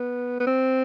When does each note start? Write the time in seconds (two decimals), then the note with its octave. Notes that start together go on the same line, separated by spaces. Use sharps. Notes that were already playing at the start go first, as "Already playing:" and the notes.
Already playing: B3
0.40 B3
0.46 C4